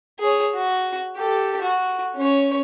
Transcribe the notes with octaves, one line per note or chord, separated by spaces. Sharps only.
G#4 C#5
F#4
G4 A4
F#4
C#4 C#5